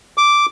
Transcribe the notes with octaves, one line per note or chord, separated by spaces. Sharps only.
D6